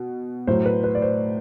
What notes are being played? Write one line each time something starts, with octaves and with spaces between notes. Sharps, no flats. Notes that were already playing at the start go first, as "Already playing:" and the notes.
Already playing: B2
A2 F#3 C5
B4
B4
D5
C5